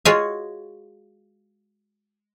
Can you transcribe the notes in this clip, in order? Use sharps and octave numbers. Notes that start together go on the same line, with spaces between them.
G#3 F4 F#4 G#4 C#5 G#5